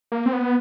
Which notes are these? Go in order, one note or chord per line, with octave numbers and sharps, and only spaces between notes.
A#3
C4
B3